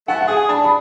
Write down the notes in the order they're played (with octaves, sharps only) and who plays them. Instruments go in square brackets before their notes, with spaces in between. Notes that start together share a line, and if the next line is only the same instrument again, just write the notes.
[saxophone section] A3 [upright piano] F#5
[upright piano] F#5
[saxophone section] G#4 [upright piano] G#5
[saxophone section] D4 [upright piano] A5
[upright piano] B5